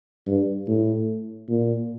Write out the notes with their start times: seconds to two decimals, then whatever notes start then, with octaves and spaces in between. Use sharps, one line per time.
0.27 G2
0.68 A2
1.49 A#2